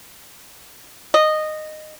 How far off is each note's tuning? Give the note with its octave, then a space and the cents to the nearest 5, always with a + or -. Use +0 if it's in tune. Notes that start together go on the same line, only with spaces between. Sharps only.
D#5 -10